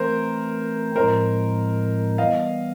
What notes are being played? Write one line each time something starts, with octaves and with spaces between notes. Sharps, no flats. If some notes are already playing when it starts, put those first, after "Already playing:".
Already playing: E3 A3 C4 A#4 C5
A2 F3 G#3 C4 A#4 C5
E3 G3 B3 D#5 F5